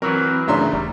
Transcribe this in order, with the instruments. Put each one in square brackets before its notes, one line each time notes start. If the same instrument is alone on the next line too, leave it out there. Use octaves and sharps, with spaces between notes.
[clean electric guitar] E3 F#3 [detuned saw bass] C4 [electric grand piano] A#4
[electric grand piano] C#3 E5 C6 [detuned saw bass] A3 [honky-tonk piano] D4 A#5
[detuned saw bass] D#1 [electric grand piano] G3